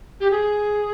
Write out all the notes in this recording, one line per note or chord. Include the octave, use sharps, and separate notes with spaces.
G4
G#4